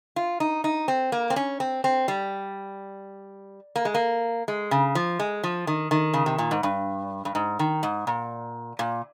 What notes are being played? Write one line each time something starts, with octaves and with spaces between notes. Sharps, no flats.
F4
D#4
D#4
C4
A#3
C4
C#4
C4
C4
G3
A#3
G#3
A#3
G#3
C#3
F3
G#3
F3
D#3
D#3
C#3
C3
A#2
G#2
G2
G2
G#2
D#3
G#2
A#2
A#2